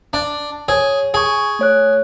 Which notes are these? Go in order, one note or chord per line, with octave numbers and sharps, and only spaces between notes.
D4
G#4 C#5
G#4 G#5 C#6
A3 C#5 F#6